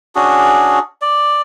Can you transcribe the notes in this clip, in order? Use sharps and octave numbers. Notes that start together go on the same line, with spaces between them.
C#4 D4 F#4 G#4
D5